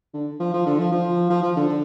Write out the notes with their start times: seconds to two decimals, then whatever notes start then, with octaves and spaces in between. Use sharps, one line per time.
0.14 D3
0.40 F3
0.53 F3
0.66 D3
0.79 F3
0.92 F3
1.30 F3
1.42 F3
1.56 D3
1.69 D3